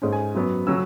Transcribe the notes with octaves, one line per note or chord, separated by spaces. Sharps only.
G#2 G#3 C#4
G#5
F#2 F#3 B3
C#3 F#3 C#4 E6